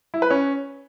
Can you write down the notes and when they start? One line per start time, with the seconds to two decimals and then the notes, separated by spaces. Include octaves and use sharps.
0.14 E4
0.22 B4
0.31 C#4